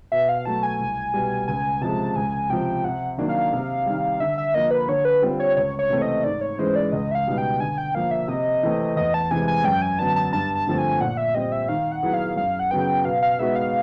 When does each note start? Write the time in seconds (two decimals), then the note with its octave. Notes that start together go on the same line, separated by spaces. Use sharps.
0.12 B2 E5
0.29 F5
0.46 F#3 A3 A5
0.63 G#5
0.80 C2
1.14 B2 G3
1.48 C#2 G#5
1.81 C3 F3 G#3 A5
2.16 C#2 G#5
2.50 C3 F3 G5
2.84 C3 F#5
3.18 D#3 F#3 A#3 D4
3.29 F5
3.53 C3
3.86 D#3 G3
4.20 D3 E5
4.38 E5
4.54 F3 A#3 D#5
4.71 B4
4.88 D3 C#5
5.05 B4
5.22 G3 C4 F4
5.40 C#5
5.56 C#2 C#5
5.79 C#5
5.90 C3 E3 A3 C4
6.02 D#5
6.24 G#2 D5
6.41 C#5
6.58 E3 G#3 C#4 C5
6.76 D5
6.92 C#2 D#5
7.11 E5
7.15 F5
7.27 B2 G3 B3 D#4
7.38 G5
7.60 D3 G#5
7.78 G5
7.94 F3 A#3 F5
8.11 E5
8.28 C3 D#5
8.63 E3 A3 C4
8.96 E2 D#5
9.14 A5
9.31 C3 E3 G#3 G#5
9.48 G#5
9.64 F#2 G5
9.82 G#5
9.99 D3 F#3 B3 D4 A5
10.16 A5
10.32 G2 A5
10.55 A5
10.67 D3 F3 A3 C4
10.78 G#5
11.01 A#2 F#5
11.17 E5
11.35 G3 C4 D#5
11.52 E5
11.68 D#3 F5
11.92 F#5
12.03 F#3 B3 E4 G#4
12.14 F5
12.36 F#2 F5
12.59 F#5
12.71 C#3 F#3 B3 G5
13.04 B2 F5
13.22 F5
13.38 G#3 B3 D#4 F#4 E5
13.56 F5